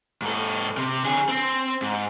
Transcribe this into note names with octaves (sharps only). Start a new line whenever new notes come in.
G#2 A4
C3
D3 G#4
C4
G#2